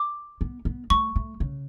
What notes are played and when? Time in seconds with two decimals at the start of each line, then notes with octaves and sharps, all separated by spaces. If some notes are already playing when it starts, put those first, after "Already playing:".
Already playing: D6
0.41 B3
0.65 B3
0.90 A3 C#6
1.16 A3
1.40 C#3